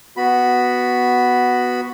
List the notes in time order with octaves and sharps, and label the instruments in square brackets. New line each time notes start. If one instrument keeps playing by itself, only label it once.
[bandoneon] B3 F#4 B5